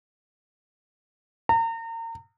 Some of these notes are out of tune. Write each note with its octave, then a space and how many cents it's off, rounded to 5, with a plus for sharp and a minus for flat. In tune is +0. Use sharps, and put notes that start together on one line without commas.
A#5 -35